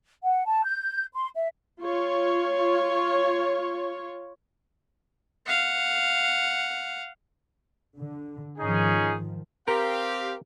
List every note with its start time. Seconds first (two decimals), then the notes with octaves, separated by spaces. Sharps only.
0.23 F#5
0.46 A5
0.64 G6
1.14 C6
1.35 E5
1.82 F4 C#5
5.46 F5 F#5
7.97 D3
8.59 G#2 D#3 F3 C#4 D#4 G#4
9.68 C4 G4 A#4 F5